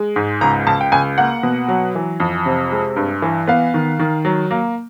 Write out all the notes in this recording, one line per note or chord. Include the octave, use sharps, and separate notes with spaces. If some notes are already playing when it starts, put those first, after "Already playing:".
Already playing: G#3
G#2
C#2 A#5
C#2 A5
G5
C#2 G#5
A#3 F#5
B2
F#3
E3
F2
C3
G#3
G2
E3
B3 F5
D#3
D#3
F#3
A#3